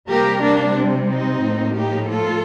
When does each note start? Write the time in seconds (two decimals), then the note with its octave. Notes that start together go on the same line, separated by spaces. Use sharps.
0.09 C3 G3 A#3 G4 A#4
0.42 A#3 D4
0.76 C4
1.09 C4 D#4
1.42 A2 F3 A#3
1.76 D#4 G4
2.08 F4 A4